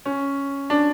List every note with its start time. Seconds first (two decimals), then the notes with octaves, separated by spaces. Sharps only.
0.05 C#4
0.70 D4